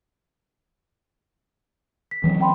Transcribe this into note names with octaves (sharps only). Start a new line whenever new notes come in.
B6
E3 F#3 C4
G5 B5 C6